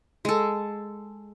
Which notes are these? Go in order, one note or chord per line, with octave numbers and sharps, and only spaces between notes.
G#3 A4